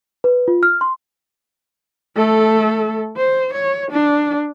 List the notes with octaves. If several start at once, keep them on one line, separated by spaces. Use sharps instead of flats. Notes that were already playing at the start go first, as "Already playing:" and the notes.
B4
F4
F6
C6
A3 A4
C5
C#5
D4